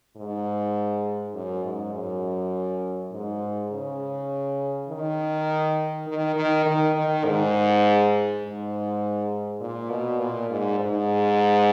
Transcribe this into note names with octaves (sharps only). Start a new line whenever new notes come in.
G#2
F#2
G#2
F#2
G#2
C#3
D#3
D#3
D#3
D#3
D#3
G#2
G#2
A#2
B2
A#2
G#2
G#2